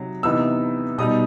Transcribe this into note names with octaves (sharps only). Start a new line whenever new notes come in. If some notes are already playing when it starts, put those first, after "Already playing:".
Already playing: C3 F#3 D#4
C3 E3 B3 D#4 E6
B2 G3 D#4 D#6